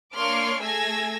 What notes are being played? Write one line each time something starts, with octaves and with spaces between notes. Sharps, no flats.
A#3 D4 C#5 C6 D6 F6
A3 G#4 G#5 E6 G#6 A#6